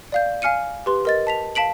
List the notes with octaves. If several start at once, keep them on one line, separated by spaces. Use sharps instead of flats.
D5 F5 G6
F5 G#5 F6 C#7 D#7
G4 B4 C6
A#4 D#5 A6
A5 B6 F7
F5 A5 B6 D7 F#7